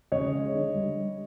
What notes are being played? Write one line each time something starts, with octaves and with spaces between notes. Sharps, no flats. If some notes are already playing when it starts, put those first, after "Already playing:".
C#3 C#5 D#5
G#3
D3
G3